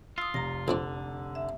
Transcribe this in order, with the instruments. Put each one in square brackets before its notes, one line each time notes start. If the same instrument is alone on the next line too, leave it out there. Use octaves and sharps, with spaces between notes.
[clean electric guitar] F4 [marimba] D#6 E6
[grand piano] F1 [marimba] A#5 A#6
[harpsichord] A#1 F2 D4 [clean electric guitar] D3
[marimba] E5